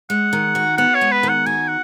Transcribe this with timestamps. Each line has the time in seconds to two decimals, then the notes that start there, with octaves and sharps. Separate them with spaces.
0.10 G#3 F#5
0.33 D#3
0.55 F#4
0.78 B3 F#5
0.95 C#5
1.01 G#3
1.12 B4
1.23 D#3
1.29 F#5
1.46 F#4 G#5
1.68 F#5